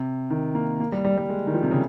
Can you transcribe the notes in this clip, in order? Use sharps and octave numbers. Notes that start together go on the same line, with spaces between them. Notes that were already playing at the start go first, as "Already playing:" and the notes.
Already playing: C3
D#3
A#3
A#3
G3
G3
G3
G#3
D#3
F3
C3
C#3